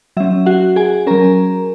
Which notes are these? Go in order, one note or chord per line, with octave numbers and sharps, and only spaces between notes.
F#3 C#4 E5
F#4 F#5
G#4 G#5
F#3 C#4 A#4 A#5